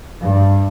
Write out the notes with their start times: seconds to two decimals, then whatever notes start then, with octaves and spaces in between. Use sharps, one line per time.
0.20 G2